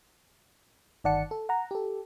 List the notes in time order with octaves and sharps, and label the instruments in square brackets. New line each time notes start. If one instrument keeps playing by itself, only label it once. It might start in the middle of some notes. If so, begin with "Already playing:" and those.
[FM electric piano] G1 D#3 D5 F#5 A5 C#7
A4
F#5 A#5
G4 A4